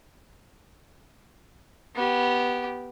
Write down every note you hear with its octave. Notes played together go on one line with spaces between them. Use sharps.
B3 G4